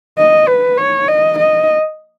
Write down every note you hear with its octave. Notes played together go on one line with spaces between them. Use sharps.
D#5
B4
C#5
D#5
D#5